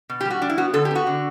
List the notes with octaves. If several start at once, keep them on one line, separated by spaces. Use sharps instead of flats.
B2
G4
G3
F#4
G3 D4
E4
B3 F#4
D3 A4
G4
B3 F#4
D3